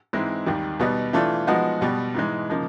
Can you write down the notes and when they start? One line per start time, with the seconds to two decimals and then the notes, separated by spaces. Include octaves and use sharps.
0.13 G#2 E3 G#3 C4 E4
0.46 D#2 D#3 G3
0.80 B2 G3 B3 D#4
1.13 E3 A3 D4 F4
1.47 F3 G#3 B3 D#4 F#4
1.81 B2 G3 B3
2.14 G#2 E3 G#3
2.50 C#3 F3 A#3 D#4